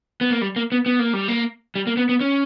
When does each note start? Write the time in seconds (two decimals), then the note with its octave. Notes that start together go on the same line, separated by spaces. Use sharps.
0.21 B3
0.30 A#3
0.42 G3
0.56 A#3
0.72 B3
0.86 B3
0.99 A#3
1.13 G3
1.28 A#3
1.76 G3
1.87 A#3
1.97 B3
2.09 B3
2.21 C#4